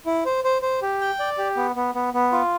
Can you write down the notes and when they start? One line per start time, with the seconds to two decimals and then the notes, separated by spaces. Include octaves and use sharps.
0.06 E4
0.25 C5
0.44 C5
0.62 C5
0.82 G4
1.01 G5
1.20 D5
1.38 G4
1.57 B3
1.76 B3
1.95 B3
2.14 B3
2.32 F4